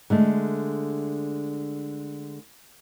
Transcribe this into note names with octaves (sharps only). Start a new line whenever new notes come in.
D3 G#3 A3